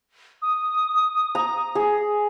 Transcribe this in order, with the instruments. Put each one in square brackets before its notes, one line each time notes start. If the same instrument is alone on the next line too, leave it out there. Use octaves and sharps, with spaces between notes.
[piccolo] D#6
[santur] A#5
G#4